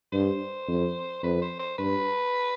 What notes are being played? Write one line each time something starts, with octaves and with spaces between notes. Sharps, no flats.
G2 C5
F2
F2 B4
C5
C5
G2 B4